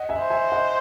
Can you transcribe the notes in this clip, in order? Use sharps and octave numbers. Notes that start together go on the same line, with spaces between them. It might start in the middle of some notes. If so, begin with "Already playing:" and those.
Already playing: D#5 F#5
E5 G#5
C5
E5 G#5
D#5 F#5